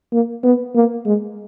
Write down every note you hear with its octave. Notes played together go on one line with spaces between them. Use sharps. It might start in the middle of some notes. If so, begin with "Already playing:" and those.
A#3
B3
A#3
G#3